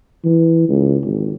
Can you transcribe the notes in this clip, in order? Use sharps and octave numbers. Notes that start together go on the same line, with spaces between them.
E3
C#2
G#1